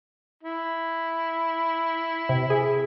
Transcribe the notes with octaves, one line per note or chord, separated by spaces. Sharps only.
E4
C3
G#4